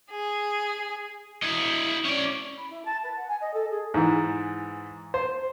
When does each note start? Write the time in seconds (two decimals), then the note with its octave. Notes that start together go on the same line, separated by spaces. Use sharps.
0.11 G#4
1.42 E4 D#5
2.05 C#4 D5
2.57 B5
2.70 E4
2.85 A5
3.04 B4
3.16 F#5
3.28 G#5
3.41 D#5
3.54 A4
3.71 G#4
3.94 G#2 E3
5.14 C5